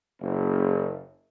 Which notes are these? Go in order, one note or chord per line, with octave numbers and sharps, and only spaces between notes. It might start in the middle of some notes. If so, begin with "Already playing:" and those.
F#1